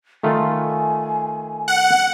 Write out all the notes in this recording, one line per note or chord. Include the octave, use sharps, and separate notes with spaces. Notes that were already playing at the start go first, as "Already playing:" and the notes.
D#3 A3 F4 G#5
F#5